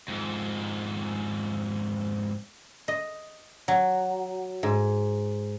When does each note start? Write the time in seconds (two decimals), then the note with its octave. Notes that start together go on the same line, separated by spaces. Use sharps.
0.08 F2 G#2
2.88 D#5
3.68 F#3
4.63 G#2